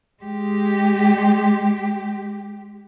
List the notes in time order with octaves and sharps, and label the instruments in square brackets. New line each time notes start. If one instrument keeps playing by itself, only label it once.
[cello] G#3 G4